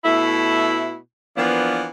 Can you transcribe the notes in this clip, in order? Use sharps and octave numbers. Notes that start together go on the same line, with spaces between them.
B2 A3 E4
E3 F3 A#3 B3 D4